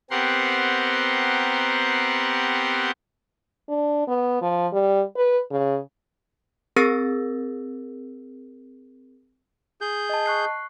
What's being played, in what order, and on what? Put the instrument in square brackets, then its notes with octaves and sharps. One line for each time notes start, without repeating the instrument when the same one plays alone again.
[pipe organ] B3 C4 G4 A#4 F#5 C6
[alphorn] D4
B3
F3
G3
B4
C#3
[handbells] C4 G#4 A#4 E6 A6 A#6
[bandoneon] G#4 G6
[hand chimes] D#5 A5
C#6 F#6 C7